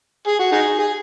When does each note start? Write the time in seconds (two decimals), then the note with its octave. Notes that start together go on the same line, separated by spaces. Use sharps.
0.27 G#4
0.39 F#4
0.52 D#4 G#4
0.79 G#4